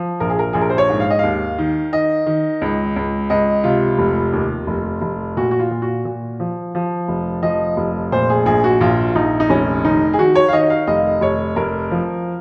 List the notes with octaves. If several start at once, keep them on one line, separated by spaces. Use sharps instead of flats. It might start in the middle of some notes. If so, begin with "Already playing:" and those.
Already playing: F3
A#1 A#4
G#4
A#4
A#1 G#4
A#4
C5
C#5
G#2
F5
D#5
D#2 F5
D#3
D#3 D#5
D#3
C#2
C#2
C#2 D#5
C3 F4
F1
D#2
F1
F1
A#2 F#4
F#4
F4
A#2
F#4
A#2
F3
F3
F1
F3 D#5
F1
A#2 C5
G#4
A#1 G#4
F#4
A#1 F4
A#1 D#4
D#4
F1 C#4
D#3 D#4
G#4
D#3 F#4
C#5
F5
D#3 D#5
F5
F1 D#5
F1 C#5
F1 A#4
F3